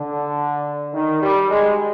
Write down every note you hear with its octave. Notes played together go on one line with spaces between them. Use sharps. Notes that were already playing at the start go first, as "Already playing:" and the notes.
Already playing: D3
D#3
G3
G#3